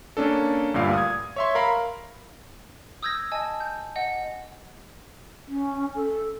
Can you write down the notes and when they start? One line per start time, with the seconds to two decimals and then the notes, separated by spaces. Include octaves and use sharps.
0.17 A#3 C#4 D4 A4
0.74 D2 G2 A#2 F5
0.93 D#6 G#6
1.36 C#5 E5 C6
1.55 A#4 F5 B5
3.03 D#6 E6 G6 G#6 A#6
3.32 D#5 G#5 A5
3.60 G6
3.96 D#5 F#5
5.48 C#4
5.95 A4